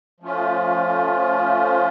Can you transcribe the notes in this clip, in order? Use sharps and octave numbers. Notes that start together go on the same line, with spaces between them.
F3 A3 C#4 F4